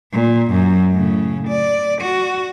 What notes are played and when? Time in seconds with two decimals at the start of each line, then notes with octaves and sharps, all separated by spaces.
0.12 A#2
0.51 F#2
0.93 A2 C#3
1.48 D5
2.02 F#4